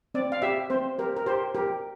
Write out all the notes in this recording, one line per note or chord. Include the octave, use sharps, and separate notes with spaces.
C4 D5
F5
G4 E5
C4 C5
G4 A#4
A#4
G4 C5
G4 A#4